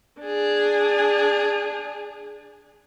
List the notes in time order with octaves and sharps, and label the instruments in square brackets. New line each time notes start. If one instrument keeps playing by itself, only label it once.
[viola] D4 G#4